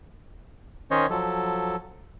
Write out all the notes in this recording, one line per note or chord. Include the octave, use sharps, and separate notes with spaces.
D#3 C#4 C5 C#5 D#5
F3 F#3 A4